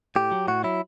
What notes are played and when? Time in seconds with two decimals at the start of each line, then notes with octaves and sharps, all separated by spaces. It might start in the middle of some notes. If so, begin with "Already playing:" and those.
0.16 A2 G4
0.32 F#3
0.47 A2 F#4
0.64 F#3 E4